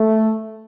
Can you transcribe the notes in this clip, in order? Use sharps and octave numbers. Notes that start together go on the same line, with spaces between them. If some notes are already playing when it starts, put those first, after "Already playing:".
Already playing: A3